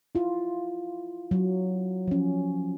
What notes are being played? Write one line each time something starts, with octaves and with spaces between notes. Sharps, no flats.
E4 F4
F#3
F3 C#4